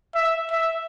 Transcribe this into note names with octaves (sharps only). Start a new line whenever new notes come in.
E5
E5